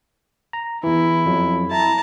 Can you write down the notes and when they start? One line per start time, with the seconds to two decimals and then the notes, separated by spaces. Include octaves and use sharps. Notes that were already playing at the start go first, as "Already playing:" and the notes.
0.53 A#5
0.83 E2 E3 E4
1.26 F2 F#3
1.71 E4 A5 A#5